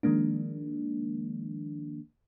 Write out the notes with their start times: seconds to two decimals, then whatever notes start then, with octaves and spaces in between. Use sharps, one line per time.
0.03 D#3 F3 G#3 A#3 D4